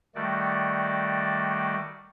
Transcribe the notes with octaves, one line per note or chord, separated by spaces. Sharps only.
D#3 G3 A3 F#4 D5